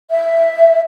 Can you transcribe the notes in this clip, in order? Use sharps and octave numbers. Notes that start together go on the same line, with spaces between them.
E5